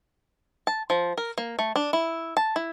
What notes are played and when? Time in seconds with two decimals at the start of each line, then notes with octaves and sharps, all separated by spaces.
0.67 A5
0.90 F3
1.17 A#4
1.38 A#3
1.59 A3
1.76 D4
1.93 E4
2.37 A5
2.56 E4